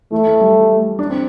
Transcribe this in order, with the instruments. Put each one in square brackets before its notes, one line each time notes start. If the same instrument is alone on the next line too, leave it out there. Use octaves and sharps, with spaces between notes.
[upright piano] E3 [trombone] A3
[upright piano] E3
G3
D4
C4